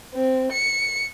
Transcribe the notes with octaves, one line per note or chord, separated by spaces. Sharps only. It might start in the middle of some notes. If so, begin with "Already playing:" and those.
C4
C#7